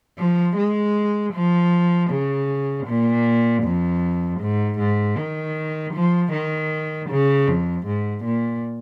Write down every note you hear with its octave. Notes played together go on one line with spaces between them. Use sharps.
F3
G#3
F3
C#3
A#2
F2
G#2
G#2
D#3
F3
D#3
C#3
F2
G#2
A#2